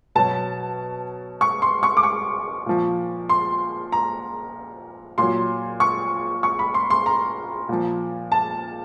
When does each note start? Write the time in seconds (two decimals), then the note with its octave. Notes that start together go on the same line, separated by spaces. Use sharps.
0.15 B2 F#3 A5
1.41 C#6
1.62 C6
1.83 C#6
1.97 D6
2.03 C#6
2.66 A#2 F3
3.29 C6
3.92 A#5
5.18 A#2 F#3 C6
5.80 C#6
6.43 C#6
6.59 B5
6.74 C6
6.90 C6
7.06 A#5
7.69 A#2 F3
8.32 A5